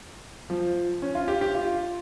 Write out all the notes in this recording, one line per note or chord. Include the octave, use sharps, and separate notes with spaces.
F3
C#4
F4
G4
G4
F4